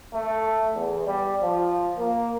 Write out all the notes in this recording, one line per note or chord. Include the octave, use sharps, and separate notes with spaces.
A3
E2
G3
F3
A#3